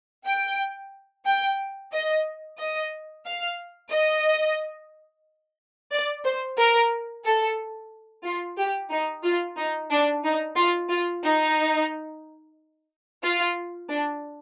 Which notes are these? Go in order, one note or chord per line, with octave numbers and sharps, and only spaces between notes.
G5
G5
D#5
D#5
F5
D#5
D5
C5
A#4
A4
F4
G4
D#4
F4
D#4
D4
D#4
F4
F4
D#4
F4
D4